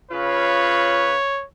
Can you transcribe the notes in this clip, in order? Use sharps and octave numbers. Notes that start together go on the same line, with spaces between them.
C#3 F4 B4 C#5